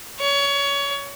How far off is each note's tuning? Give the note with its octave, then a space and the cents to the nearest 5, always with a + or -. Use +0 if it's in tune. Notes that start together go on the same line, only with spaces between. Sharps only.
C#5 +25